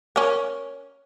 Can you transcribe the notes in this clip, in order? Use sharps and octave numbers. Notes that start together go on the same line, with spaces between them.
C#4 A#4